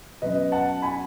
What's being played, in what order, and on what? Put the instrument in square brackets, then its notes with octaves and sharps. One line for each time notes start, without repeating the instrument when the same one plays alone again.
[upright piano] B2 F#3 C#4 B4 D#5
F#5 A5
G#5 B5